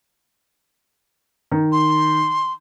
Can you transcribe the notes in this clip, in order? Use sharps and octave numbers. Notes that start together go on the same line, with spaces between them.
D#3
C6